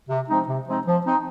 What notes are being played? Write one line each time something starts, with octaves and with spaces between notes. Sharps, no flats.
C3
F3 G#3 C4 D#4
C3
F3 G#3 C4 D#4
F3
C4 D#4